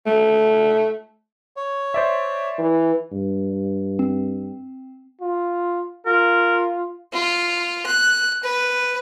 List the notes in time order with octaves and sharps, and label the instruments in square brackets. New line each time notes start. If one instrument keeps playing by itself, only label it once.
[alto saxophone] A3
[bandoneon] C#5
[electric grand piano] C5 D5 E5
[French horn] E3
[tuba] G2
[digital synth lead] C4
[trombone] F4
[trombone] F4 [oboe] A#4
[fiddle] F4
F#6
B4